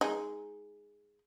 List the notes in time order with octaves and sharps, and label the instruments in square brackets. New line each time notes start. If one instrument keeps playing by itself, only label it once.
[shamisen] G#3 D#4